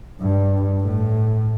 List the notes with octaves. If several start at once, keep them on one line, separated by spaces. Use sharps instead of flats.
G2
A2